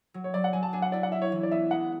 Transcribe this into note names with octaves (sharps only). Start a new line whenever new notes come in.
F#3
C#5
F#3 D5
F#5
F#3 G#5
A5
D4 G#5
F#5
E4 D5
F#5
E4 E5
C#5
E3
D5
B3 E5
G#3 F#5